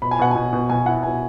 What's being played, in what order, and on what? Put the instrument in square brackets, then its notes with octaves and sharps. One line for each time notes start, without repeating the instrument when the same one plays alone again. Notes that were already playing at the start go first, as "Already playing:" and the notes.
[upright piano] B2 B5
G#5
B2 F#5
B2 G#5
B2
B2 G#5
E4 F#5
B2 G#5